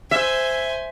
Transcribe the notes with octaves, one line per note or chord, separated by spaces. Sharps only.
C5 E5 G#5